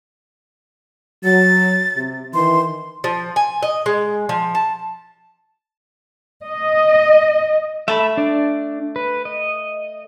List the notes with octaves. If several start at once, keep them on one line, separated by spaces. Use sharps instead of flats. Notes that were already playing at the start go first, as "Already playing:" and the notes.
F#3 A6
C3
D#3 E3 C6
F3
G#5
D#5
G#3
F3
A5
D#5
A3 E5 A5 B5
D4 D5
B4
D#5